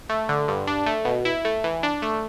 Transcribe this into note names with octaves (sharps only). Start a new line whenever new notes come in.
A3
D3
G2
D4
A3
B2
E4
A3
E3
D4
A3